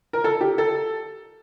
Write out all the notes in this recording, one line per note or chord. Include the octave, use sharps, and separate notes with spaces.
A#4
A4
G4
A4